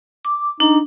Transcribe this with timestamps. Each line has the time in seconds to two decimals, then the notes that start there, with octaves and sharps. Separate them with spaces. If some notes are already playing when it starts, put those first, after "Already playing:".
0.25 D6
0.60 D4 D#4